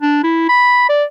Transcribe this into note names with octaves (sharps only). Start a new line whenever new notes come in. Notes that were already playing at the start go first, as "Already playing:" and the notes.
D4
E4
B5
D5